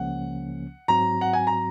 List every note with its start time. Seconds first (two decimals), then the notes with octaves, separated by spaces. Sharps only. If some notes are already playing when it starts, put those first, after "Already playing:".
Already playing: C#2 C#3 F3 A#3 C#4 F#5
0.88 G#2 F#3 C4 F#4 A#5
1.21 F#5
1.33 G#5
1.47 A#5